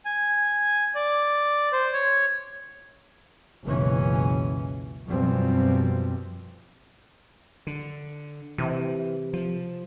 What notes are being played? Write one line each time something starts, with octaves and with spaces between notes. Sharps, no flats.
G#5
D5
C5
C#5
F#1 C#2 B2 E3 C#4
F#2 B2 F3 G3 B3 C4
D3
C3 E3
F3